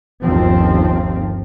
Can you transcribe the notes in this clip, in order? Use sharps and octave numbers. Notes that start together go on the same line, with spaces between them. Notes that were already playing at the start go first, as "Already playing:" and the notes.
G1 D#2 F3 C4